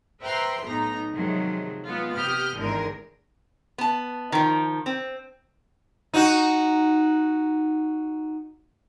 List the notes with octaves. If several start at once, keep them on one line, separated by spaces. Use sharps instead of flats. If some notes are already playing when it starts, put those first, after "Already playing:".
B4 C5 E5 G5 A#5 C6
B1 A2 B3 D#4 A#5
C3 D#3 F3 F#3 G#3
G#3 B3 F4
C3 B3 G4 D#6 F6 G6
G#1 E2 D3 D#3 G#3 A#4
B3 A5
D#3 F3
C4
D#4 F#4